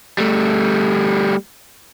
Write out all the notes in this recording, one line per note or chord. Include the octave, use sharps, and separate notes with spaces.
G3 A3